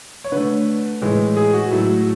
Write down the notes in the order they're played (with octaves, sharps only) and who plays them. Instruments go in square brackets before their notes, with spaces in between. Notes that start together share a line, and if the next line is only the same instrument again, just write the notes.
[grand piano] C#5
D3 A3 B4
A2 E3 G#3
G#4
F#4
A2 F#3 A3